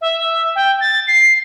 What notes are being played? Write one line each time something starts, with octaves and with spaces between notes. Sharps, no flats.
E5
G5
A6
C7